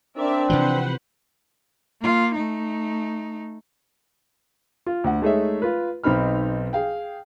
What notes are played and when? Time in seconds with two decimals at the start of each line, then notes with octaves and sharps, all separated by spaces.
0.17 C4 D4 A#4 D5 E5
0.50 C3 E3 F3 B4 C5 F#5
2.01 A#3 F4
2.35 A3 D#4
4.86 F4
5.04 D2 F#5
5.22 G#3 A3 D#4 G#4 C#5 E5
5.62 F4 B4
6.04 B1 C4 D#4 B5 F6
6.73 G#4 F5 G5